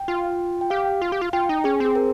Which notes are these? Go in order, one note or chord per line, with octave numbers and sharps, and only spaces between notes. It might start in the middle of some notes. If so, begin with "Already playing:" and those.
Already playing: G5
F4
G5
G4 F5
F4
G4
F4
F4 G5
D#4
C#4 G#4
C4 G#4
A#4